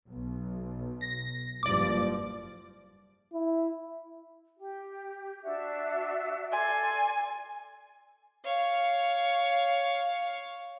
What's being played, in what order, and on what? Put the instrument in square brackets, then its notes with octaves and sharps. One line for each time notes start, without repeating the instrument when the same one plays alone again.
[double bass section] B1
[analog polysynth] A#6
[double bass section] F#1 G2 F3 [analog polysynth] D5 D6
[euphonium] E4
[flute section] G4
D4 F#4 E5
[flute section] A4 D5 C6 [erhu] G#5
[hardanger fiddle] C#5 F5